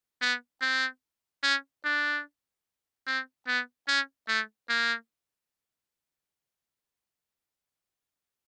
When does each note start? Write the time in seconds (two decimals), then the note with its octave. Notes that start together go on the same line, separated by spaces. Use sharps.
0.21 B3
0.61 C4
1.43 C#4
1.84 D4
3.07 C4
3.47 B3
3.88 C#4
4.28 A3
4.69 A#3